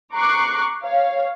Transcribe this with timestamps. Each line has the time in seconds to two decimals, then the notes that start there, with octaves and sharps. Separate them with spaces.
0.14 A#5 C#6 D6 F#6 C7
0.84 C#5 F5